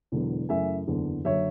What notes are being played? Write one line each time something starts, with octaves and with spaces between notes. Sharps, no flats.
E1 E2 D3 F#3
F#2 C#3 E3 A3 E5 G#5
F#1 E2 D3
F#1 D3 F#3 C#5 E5